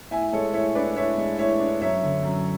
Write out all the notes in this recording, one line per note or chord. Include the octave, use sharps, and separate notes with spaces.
A2 E5 G#5
G#3 A4 C#5
A2 C#5 E5
D4 B4 D5
A2 C#5 E5
G#3
A2 C#5 E5
D4
F#2 C#5 E5
D3
F#2